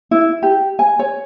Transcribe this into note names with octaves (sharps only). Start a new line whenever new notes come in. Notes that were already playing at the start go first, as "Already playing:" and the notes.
E4
G4
G#5
C#5